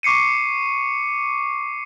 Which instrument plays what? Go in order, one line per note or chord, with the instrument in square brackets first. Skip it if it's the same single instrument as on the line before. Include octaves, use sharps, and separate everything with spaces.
[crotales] C#6 D6 C7 C#7 D#7